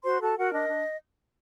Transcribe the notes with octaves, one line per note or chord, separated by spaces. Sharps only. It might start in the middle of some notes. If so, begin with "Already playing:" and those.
F#4 C5 C6
F#4 A4 A5
F#4 A#4 F#5
D4 D#5
D4